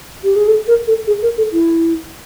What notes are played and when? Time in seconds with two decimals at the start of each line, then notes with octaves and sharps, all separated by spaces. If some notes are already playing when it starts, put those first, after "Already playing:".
0.24 G4
0.36 G#4
0.48 A4
0.67 A#4
0.87 A4
1.07 G#4
1.22 A#4
1.37 A4
1.52 E4